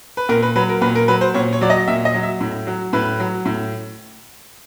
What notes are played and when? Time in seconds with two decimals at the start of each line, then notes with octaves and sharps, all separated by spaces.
0.17 B4
0.29 A#2 A#4
0.42 B4
0.56 F#3 B4
0.69 A#4
0.81 A#2 B4
0.95 A#4
1.08 F#3 B4
1.21 C5
1.34 A#2 C#5
1.53 C#5
1.61 F#3 D5
1.70 D#5
1.88 A#2 E5
2.05 D#5
2.14 F#3
2.23 E5
2.41 A2
2.67 F#3
2.93 A2 B4
3.20 F#3
3.45 A2